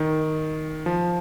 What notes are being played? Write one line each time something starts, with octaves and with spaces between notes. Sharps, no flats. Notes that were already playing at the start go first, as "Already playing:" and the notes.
Already playing: D#3
F3